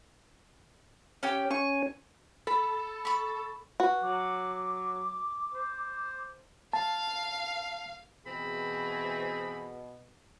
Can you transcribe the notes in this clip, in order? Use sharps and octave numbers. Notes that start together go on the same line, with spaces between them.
C#4 G4 C#5 G5
C#4 C#5 G#5 C#6
A4 B5
B5 C#6
F#4 B4
F#3 D6
C5
F5 A5
B2 E3 C4 G#4 B5